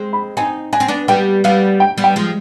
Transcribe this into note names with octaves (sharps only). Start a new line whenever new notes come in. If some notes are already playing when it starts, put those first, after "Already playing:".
Already playing: G#3 C4
B5
C4 D#4 G#5
D4 G#5
C4
B3 D4
G3 B3 G5
G3 B3 F5
G5
G3 B3
G5
F3 G#3